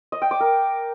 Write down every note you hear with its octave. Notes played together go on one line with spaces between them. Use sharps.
D#5
G5
D6
A#4